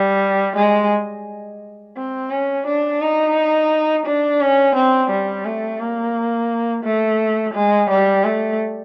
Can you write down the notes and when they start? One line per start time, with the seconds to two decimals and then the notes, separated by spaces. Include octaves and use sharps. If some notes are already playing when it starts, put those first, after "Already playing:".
Already playing: G3
0.56 G#3
1.96 C4
2.31 C#4
2.66 D4
3.01 D#4
4.06 D4
4.41 C#4
4.75 C4
5.11 G3
5.45 A3
5.80 A#3
6.84 A3
7.54 G#3
7.90 G3
8.25 A3